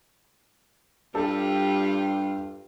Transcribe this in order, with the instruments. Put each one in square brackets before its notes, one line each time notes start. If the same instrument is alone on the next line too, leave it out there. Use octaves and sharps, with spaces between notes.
[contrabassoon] G2 [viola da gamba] G3 F4 [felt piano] G4 A4